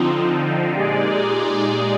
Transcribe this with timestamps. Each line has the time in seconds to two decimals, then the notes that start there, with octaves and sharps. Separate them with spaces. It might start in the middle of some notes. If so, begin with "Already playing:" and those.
Already playing: D3 F3 C4 D#4 F4
0.75 A#2 G#3 D#4 G4 G#4 D5